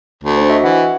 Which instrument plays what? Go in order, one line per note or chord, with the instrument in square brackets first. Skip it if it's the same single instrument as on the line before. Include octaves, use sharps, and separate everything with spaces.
[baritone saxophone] D2
[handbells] D4 C5
F#4 D#5 E5
[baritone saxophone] E3 [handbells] F#5